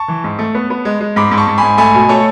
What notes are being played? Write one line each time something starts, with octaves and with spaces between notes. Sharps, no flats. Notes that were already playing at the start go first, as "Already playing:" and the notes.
Already playing: A5 C#6
E3
G#2
A3
B3
B3
G#3
G#3
G#2 B5 D6
G#2
A5 C#6
G#2
G#5 B5
G#2
A3 G#5 B5
B2
A3 A4 C#5